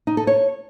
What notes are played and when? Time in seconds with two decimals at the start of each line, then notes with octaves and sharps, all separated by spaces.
0.07 D#4
0.17 A4
0.27 C#5